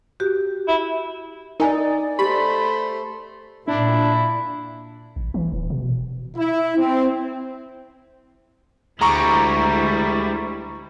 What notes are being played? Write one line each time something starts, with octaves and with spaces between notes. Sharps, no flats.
F#4 G4
E4
D#4 A#4 D5 G#5
A3 G4 C5 B5
A#2 D4 E4
A1
E3
D#1
B2
E4
C4
D2 G3 G#3 E4 A#5 C#6